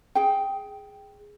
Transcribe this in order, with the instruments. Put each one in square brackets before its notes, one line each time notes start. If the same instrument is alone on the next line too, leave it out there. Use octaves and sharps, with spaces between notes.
[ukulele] G#4 G5